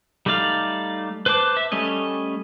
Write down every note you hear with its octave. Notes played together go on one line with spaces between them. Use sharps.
G3 A3 D#4 D5 F5
B4 C5 A5 D6
E5
G3 A3 C#4 D#5